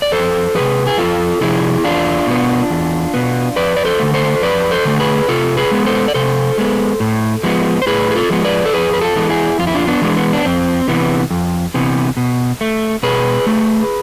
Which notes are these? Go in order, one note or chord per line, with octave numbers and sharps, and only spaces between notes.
D5
F2 A4 C5
C3 F3 G#4 B4
G#4
F2 F4 A4
C3 F3 E4 G#4
E2 D4 F4
B2 B3
E2
B2 B3
F2 B4 D5
D5
A4 C5
D3 A3
A4 C5
F2 B4 D5
A4 C5
D3 A3
G#4 B4
C3 F4 A4
G#4 B4
G#3 B3
A4 C5
D5
C3 A4 C5
G#3 B3
A2
F3 G#3 B3
C5
A2 G#4 B4
G#4
F4 A4
F3 G#3 B3
B4 D5
A4
F2 G#4 B4
B4
F4 A4
E3 G#3 B3
E4 G#4
F2 F4
E4
D4 F4
B3 D4
E3 G#3 B3
B3
D4
F2 C4
C3 E3 B3
F2
C3 E3 B3
B2
A3
B2 G#4 B4
A3